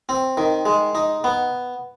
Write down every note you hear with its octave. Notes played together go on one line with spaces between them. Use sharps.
C4
D#3
G#3
D#4
B3